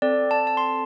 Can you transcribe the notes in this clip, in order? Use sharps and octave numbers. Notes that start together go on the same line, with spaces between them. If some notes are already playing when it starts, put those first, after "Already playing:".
C4 A4 D5
A5
A5
C6